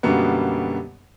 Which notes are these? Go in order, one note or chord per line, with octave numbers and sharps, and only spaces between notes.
F#2 B2 D3 G3 A#3 B3